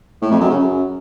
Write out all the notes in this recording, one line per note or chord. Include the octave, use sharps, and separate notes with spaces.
A2
F2
F#2
C#3
F#2